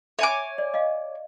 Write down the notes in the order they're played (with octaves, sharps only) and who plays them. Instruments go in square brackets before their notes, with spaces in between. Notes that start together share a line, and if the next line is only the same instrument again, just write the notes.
[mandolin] C#5 G#5 D6 [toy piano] E5
[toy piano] D5
D#5 F5